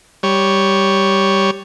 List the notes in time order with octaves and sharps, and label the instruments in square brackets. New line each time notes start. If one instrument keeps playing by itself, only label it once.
[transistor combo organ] G3 C#5